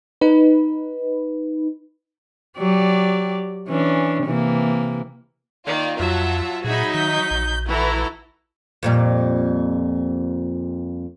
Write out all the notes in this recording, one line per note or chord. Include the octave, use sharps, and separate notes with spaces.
D#4 B4
F#3 G4 D5
E3 C#4 D4
C3 E3 A#3
D#3 A#3 F4 D5
F2 F#3 F4 E5 F#5 A5
A#2 F#3 D#4 F#4 G#4 E5 B5
D#3 G6 B6
A#1
E3 E4 F#4 A4 A#5
F2 A#2 G3